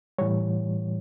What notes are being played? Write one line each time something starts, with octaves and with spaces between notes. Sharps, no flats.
A2 E3 G3 C#5